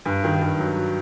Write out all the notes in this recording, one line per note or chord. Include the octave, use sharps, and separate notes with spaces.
G2
D#3
G2
F#3